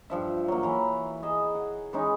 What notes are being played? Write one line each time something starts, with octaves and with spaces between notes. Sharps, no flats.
G2 F3 E5
F#3 A#3
E3 A#5 B5
G#4 D#5 E5
F#5
E3 G#3 C#4 D#4